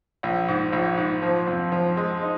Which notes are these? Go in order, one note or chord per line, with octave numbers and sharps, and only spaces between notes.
A#1
G#2
A#1
G#2
F3
F2
F3
G#3
D#4